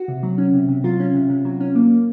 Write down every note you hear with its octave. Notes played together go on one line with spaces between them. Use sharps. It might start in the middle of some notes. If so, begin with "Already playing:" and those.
Already playing: F#4
C3
F#3
C#4
C3
C3
F#3 F4
C#4
C3
C3
F#3
C#4
A#3